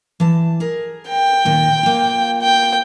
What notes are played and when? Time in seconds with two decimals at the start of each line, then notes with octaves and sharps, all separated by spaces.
0.20 E3 A5
0.60 G#4 A#4
1.09 G5
1.45 D#2 A#2 D#3
1.83 A#3 F4
2.41 G5